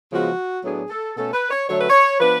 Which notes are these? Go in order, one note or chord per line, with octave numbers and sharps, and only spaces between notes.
C#3 F3 G#3 B3 F#4
A2 F#3 B3 D4 G#4
A4
B2 A3 C#4 A4
B4
C#5
D3 F#3 A3 C#5
B4
C#5
F3 B3 D4 B4